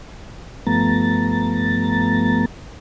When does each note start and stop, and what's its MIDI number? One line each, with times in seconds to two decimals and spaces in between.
0.67 2.45 43
0.67 2.45 53
0.67 2.45 57
0.67 2.45 59
0.67 2.45 82
0.67 2.45 93